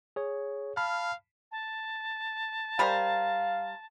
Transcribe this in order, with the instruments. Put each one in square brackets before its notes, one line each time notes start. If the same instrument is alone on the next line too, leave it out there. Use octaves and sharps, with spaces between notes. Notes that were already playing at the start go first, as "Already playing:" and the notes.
[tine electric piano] G#4 C#5
[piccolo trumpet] F5 [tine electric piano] A5 B5 F6
[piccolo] A5
[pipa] G3 A#4 C5 [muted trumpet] F5